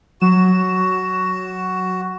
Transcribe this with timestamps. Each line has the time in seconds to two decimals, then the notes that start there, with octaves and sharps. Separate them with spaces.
0.21 F#3 F#4 E7